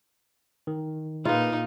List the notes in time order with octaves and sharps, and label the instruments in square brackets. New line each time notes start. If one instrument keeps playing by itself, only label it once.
[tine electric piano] D#3
[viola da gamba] A#2 D#4 [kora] F4 [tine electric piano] G#4 B4